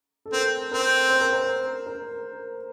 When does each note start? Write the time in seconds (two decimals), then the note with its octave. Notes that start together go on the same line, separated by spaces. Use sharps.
0.26 A4
0.33 C4 A#4
0.71 C4 A#4
1.10 C5
1.21 A#4
1.33 C5
1.87 A#4